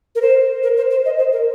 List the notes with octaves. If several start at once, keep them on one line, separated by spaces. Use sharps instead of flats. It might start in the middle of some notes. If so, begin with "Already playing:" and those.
A#4
C5
A#4
C5
C5
D#5
C5
A#4